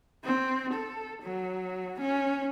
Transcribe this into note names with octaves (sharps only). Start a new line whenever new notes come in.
C4
A4
F#3
C#4